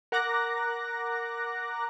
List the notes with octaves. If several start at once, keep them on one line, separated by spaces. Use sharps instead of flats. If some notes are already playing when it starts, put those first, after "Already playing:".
A#4 F#5 A#5 D6 F#6 A#6